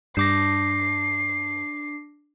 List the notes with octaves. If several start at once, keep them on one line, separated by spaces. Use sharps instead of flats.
G2 D4 D6 A#6 C7